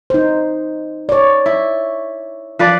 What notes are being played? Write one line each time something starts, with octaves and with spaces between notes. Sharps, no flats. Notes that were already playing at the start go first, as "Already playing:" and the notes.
D#4 C5
C#5 D5
E4
F3 B4 D5